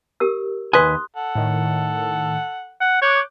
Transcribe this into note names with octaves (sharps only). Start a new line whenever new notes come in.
G4 A#4 E6
D#2 B4 G#5 C6 D#6 F#6
A4 F#5
A2 D#3
F#5
C#5 D6 F#6 G6